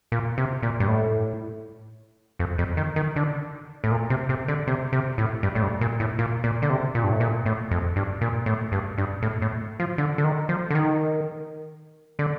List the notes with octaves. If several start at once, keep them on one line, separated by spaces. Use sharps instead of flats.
A#2
C3
A#2
G2
A2
F2
F2
D#3
D#3
D3
A2
A#2
C3
C3
D3
C3
C3
A2
G2
A2
G2
A#2
A2
A#2
A#2
D3
C3
A#2
G2
A2
A#2
A2
F2
G2
A#2
A2
G2
G2
A2
A2
F3
D3
D3
D#3
F3
D3
D#3
D3